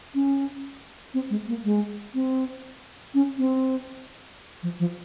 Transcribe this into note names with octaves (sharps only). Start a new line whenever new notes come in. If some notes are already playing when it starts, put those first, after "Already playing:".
C#4
C4
G#3
A#3
G#3
C4
C#4
C4
F3
F3